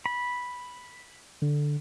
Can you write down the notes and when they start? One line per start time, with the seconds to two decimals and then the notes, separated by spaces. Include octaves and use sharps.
0.06 B5
1.42 D3